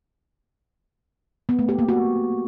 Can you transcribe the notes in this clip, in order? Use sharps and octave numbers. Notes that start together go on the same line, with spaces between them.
B3
A3
G4
A#3
F#4